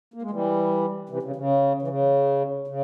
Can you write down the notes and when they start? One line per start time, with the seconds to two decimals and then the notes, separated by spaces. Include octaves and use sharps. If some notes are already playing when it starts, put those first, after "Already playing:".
0.14 A#3
0.22 G#3
0.31 E3 G3
1.09 C3 E3
1.23 C#3
1.36 C#3
1.82 E3
1.88 C#3
2.67 C#3